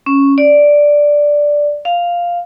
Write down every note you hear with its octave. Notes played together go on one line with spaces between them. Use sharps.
C#4
D5
F5